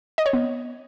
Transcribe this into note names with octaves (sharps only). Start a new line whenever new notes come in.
D#5
C#5
B3